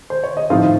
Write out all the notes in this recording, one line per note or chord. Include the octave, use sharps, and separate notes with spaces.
C5
C#5
D#5
A2 F3 C4 D#4 F4 F5